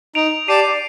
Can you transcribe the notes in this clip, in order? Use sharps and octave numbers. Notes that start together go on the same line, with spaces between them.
D#4 D7 F7
G4 D5 A5 C7 D#7